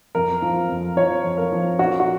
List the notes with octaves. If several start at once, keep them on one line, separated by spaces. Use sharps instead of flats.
F2 A#4
F3
F2
F3 C#5
F2
A#4
F3
F3 F#4
F#4